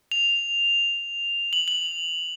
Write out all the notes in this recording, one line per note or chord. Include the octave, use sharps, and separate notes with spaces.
F7
F#7
F#7